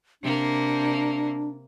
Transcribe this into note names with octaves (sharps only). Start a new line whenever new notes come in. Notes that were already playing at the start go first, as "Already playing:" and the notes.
C3 A#3 D4